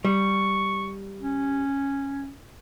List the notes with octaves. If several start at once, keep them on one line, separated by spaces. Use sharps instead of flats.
G3 C#6
C#4